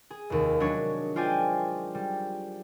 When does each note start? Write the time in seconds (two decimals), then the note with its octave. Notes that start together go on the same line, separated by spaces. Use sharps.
0.10 G#4
0.30 F1 D#2
0.60 F#3 G#3 D4 C#5
1.15 G#3 F4 C5 D5 G5 G#5
1.95 G3